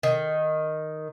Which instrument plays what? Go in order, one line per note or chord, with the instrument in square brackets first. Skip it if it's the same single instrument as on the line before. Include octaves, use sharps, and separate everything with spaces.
[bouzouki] D#3